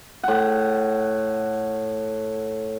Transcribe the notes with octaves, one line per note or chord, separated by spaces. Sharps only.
A2 F#5